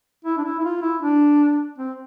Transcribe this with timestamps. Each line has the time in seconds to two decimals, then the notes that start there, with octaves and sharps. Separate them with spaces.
0.25 E4
0.38 D4
0.44 E4
0.59 E4
0.64 F4
0.82 E4
1.02 D4
1.78 C4